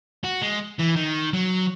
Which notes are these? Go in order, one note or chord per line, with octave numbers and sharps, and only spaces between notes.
F#4
G#3
E3
D#3
F#3